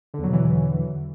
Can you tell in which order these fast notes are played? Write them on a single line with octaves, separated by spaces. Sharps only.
D3 E2 F#3 B2 E3